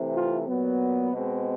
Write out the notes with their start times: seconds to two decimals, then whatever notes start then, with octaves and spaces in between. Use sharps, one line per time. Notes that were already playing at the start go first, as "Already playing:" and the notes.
Already playing: C3 E3 A3 C4
0.15 F4
0.48 A#2 F#3 B3
1.13 B2 G#3 C4